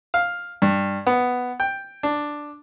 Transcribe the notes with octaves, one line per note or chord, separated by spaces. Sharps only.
F5
G2
B3
G5
D4